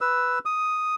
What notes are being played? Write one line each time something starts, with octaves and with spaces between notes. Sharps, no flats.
B4 E6
D#6